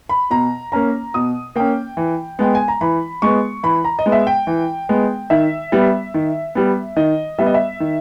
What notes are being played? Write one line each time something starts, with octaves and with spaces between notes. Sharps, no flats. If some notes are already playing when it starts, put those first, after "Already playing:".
B5
B2 A#5
A#3 C#4 A#5
B2 D#6
A#3 C#4 G5
E3
G#3 B3 G5
G#5
A#5
E3 B5
G#3 B3 C#6
E3 B5
A#5
D#5
G#3 B3
E5
G5
E3
G#3 B3
D#3 E5
G3 B3
D#3
G3 B3
D#3 D#5
G3 B3 E5
D#5
E5
D#3